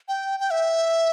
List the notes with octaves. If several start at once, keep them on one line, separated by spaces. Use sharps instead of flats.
G5
G5
E5